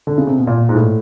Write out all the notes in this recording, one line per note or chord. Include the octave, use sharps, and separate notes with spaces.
D3
C#3
C3
B2
A#2
G#2
A2